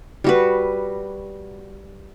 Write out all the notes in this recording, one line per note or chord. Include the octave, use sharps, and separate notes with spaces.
G3 F#4 B4